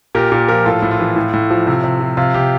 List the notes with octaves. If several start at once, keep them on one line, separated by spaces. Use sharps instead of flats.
A#2 G4 A#4
A#2
F3 G4 A#4
A2 F4 A4
A2
F4
E3
A2
A2
F3
C3
C3
F3
C3 F4
C3 G4